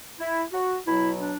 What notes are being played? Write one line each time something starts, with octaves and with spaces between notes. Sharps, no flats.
E4
F#4
B2 F#3 E4
D4